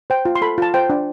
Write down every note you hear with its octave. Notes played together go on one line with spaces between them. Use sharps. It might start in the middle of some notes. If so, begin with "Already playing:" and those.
C5 G5
F4
C6
A4 B5
F4 A5
C5 G5
D4